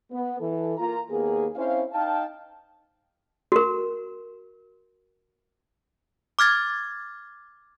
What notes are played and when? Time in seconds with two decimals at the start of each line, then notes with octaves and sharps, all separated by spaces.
0.10 B3
0.40 E3 A4
0.78 A#3 F4 A#5
1.09 D#2 A#3 B3 G#4
1.56 C4 C#4 E4 C5 F5
1.93 D#4 F5 G5 A5
3.52 F#4 A#4
6.39 D6 F6 G#6 A6